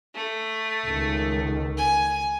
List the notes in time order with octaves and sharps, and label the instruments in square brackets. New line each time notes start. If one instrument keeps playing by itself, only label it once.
[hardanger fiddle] A3
[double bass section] C#2 D#3
[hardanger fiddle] G#5